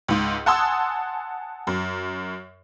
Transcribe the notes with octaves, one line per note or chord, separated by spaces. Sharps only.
C#2 G#2
F#5 G#5 A5 C6 D#6 E6
F#2